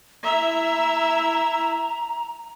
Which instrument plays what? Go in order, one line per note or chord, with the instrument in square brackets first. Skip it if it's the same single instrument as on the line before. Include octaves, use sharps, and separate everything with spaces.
[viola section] E4 E5 [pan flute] A#5